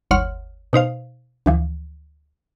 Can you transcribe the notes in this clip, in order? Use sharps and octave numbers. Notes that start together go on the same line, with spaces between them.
G1 D#2 C#5 F#5 C6 F6
B2 D#4 C5 F5
D2 E3 F3